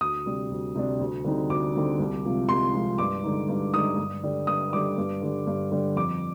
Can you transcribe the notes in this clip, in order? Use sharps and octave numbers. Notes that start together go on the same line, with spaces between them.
D2 D#6
C3 G3 D4
D2
C3 G3 D4
D2
D3 G3 C4 D#4
D2 D6
D3 G3 C4 D#4
C2
C3 F3 G#3
C2 C6
C3 F3 G#3
G2 D6
D3 G#3 D#4
G2
D3 G#3 D#4 D#6
G2
D3 G3 D4
G2 D#6
D3 G3 D4 D6
G2
D3 G3
G2
D3 G3
F2 D6